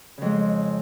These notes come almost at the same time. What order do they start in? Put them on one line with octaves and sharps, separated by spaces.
C#3 F2 G#3